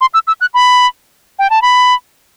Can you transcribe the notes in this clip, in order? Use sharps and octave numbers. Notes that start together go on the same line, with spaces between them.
C6
E6
E6
F#6
B5
G5
A5
B5